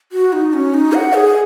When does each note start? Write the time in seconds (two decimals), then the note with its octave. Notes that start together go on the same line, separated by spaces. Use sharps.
0.12 F#4
0.33 D#4
0.53 C#4
0.74 D#4
0.93 F#5
1.14 G#4